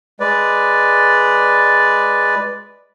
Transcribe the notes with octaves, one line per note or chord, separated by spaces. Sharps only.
G#3 B4 D5